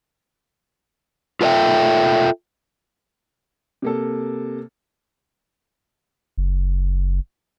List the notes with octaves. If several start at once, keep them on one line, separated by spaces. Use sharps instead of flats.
F4 A4 A#4 D#5 E5 G5
C3 A#3 A4
F#1